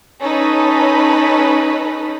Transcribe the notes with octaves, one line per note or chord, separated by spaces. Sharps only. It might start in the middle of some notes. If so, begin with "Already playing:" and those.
C#4 D#4 A4 B4 B5